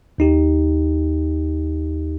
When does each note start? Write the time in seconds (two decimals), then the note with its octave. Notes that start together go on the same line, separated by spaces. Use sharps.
0.18 D#2 D#4 G4